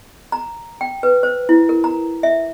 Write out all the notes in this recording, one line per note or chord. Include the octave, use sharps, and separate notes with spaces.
A#5
G5
B4
C5
E4
A#4
A#5
E5